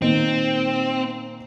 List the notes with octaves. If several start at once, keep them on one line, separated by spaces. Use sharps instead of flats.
A#2 D#3 C4